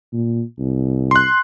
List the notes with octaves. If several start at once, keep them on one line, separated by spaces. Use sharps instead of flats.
A#2
C2
C6 F#6